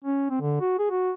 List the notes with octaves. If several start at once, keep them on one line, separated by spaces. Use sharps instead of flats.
C#4
C4
D3
F#4
G#4
F#4